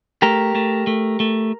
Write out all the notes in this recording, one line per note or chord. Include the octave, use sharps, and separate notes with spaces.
A3 G4 A#4
A3
A3
A3